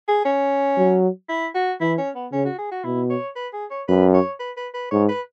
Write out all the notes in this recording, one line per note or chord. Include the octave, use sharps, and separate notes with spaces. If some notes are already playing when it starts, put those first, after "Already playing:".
G#4
C#4
F#3
E4
F#4
E3 E4
C#4
B3
C#3 C#4
F#4
G#4
F#4
B2 E4
C#5
B4
G#4
C#5
F#2 B4
C#5
B4
B4
B4
G#2 C#5
B4